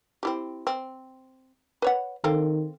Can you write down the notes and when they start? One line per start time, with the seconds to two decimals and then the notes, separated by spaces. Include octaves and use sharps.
0.23 C4 E4 G4
0.67 C4
1.82 B4 C#5 F#5
2.24 D#3 C4 A4 F5